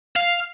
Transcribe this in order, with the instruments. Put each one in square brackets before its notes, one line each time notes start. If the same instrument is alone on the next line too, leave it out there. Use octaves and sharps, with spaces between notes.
[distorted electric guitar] F5